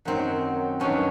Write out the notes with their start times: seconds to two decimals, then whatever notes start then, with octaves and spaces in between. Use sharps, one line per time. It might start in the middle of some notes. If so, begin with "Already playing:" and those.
0.05 F#2 D#3 F#3 C4
0.80 G2 D#3 F#3 C#4